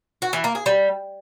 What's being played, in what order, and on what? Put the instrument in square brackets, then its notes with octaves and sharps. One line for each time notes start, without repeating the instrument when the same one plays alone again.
[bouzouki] F#4
E3
A#3
G#4
G3